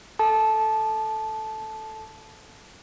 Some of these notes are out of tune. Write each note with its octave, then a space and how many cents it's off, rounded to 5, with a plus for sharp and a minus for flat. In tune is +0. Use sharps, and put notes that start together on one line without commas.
A4 +0 A5 -15